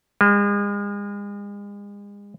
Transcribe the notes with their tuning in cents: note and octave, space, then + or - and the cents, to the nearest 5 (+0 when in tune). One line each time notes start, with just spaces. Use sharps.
G#3 -40